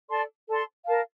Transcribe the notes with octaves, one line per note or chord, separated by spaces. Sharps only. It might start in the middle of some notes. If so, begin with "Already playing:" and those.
A4 D5 A5 C6
A4 D5 A5 C6
A#4 F5 A5